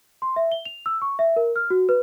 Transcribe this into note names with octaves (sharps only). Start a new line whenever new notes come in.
C6
E5
G7
F7
E6
C#6
E5
A#4
F6
F#4
B4